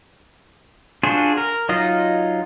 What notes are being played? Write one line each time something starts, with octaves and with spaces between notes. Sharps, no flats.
D4 F4 F#4 G#4 C5
A#4
F#3 D#4 F4 D#5